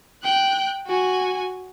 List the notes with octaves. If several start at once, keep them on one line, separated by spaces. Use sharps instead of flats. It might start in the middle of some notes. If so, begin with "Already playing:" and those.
G5 F#6
F#4 G#5